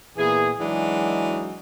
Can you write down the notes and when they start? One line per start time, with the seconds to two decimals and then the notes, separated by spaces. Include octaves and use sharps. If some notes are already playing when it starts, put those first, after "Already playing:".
0.17 A#2 E3 B3 G#4
0.60 E3 F#3 G#3 D4 D#4 F#4